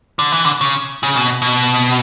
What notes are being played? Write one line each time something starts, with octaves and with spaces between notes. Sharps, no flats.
D3
E3
D3
C#3
C#3
B2
B2